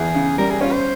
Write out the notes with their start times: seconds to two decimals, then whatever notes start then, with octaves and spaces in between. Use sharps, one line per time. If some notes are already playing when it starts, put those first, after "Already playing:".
Already playing: E2 G#4
0.15 C#3
0.38 G3 A#4
0.50 G#4
0.61 C#4 F4
0.72 C5